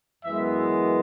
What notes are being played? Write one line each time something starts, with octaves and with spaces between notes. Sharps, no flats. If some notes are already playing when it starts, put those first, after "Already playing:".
F#2 E3 G#3 B3 E5